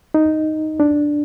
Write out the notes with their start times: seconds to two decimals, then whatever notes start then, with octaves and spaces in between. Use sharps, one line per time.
0.14 D#4
0.80 D4